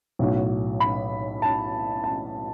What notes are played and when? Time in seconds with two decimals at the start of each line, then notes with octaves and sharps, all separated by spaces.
0.19 B1 A2 F#3
0.80 B5
1.42 A5
2.04 A5